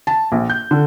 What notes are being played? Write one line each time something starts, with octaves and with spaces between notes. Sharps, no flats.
A5
A#1
G6
D3